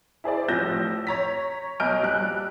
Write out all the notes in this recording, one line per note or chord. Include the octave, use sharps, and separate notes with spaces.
E4 G#4 C5 D5
A1 A2 F3 G6 A#6 E7
C#5 A#5 B6
B1 D#5 G#5 F6 G6 D7
A#1 G3 F#6